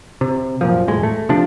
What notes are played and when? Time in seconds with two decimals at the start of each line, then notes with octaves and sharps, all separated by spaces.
0.21 C3
0.61 F#2 A#2 F3
0.87 E1 A2 G#3
1.03 A3
1.29 C3 F3 D4